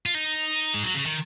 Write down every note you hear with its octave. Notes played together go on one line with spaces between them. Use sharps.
F4
D#4
G#3
F#3
C#3
D#3